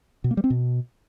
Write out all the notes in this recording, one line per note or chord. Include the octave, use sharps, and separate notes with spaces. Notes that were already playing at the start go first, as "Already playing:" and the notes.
B2
A#3
G3
C4
B2